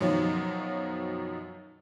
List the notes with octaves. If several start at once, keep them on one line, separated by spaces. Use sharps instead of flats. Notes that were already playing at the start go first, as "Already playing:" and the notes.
F#2 B2 D#3 F3 F#3